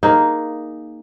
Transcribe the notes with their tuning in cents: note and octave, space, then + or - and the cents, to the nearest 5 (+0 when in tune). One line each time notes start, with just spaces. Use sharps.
A#3 +0 D#4 +0 G#4 -5